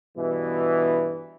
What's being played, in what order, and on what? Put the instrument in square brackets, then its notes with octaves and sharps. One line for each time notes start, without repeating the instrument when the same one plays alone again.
[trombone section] G2 B2 E3